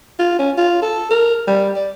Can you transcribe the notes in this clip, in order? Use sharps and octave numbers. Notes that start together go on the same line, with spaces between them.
F4
C#4
F4
A4
A#4
G3
D5